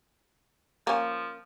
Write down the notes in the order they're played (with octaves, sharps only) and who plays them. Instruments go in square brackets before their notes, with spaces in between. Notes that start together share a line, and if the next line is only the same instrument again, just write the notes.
[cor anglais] F3 [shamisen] A#3 C#4